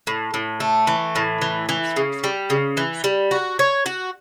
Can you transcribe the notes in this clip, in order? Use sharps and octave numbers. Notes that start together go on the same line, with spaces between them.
A2
A2
A3
E3
A2
E3
E3
C#3
G3
C#3
E3
G3
F#4
C#5
F#4